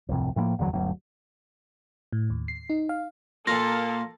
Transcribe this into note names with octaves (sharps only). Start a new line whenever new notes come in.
D1 C2 F2 C3
A2 F3 G#3 A#3
F#1 E2 D3 F#3
G1 D2 F#3
A2
D#2
C7
D#4
F5
A#2 A#3 F4 A4 A#6